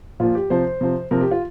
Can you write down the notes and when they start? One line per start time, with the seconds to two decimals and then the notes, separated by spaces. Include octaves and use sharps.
0.20 A#2 F3 F4
0.35 G4
0.50 C3 F3 C5
0.81 C3 F3
1.11 C3 F3 A#4
1.21 G4
1.31 F4